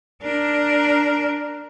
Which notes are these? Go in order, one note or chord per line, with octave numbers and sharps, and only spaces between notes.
D4 A#4